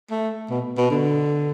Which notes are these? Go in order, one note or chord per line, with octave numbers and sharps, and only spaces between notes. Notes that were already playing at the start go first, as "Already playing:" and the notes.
A3
B2
B2
D3